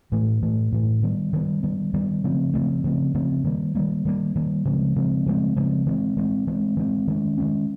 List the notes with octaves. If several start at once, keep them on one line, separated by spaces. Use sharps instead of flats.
A2 E3 A3
A2 E3 A3
A2 E3 A3
D#3 G3 B3
D#3 G3 B3
D#3 G3 B3
D#3 G3 B3
C#3 F3 A3 C4
C#3 F3 A3 C4
C#3 F3 A3 C4
C#3 F3 A3 C4
D#3 G3 A#3
D#3 G3 A#3
D#3 G3 A#3
D#3 G3 A#3
C#3 F3 G#3 C4
C#3 F3 G#3 C4
C#3 F3 G#3 C4
C#3 F3 G#3 C4
E3 G#3 C4
E3 G#3 C4
E3 G#3 C4
E3 G#3 C4
D#3 G#3 C#4
D#3 G#3 C#4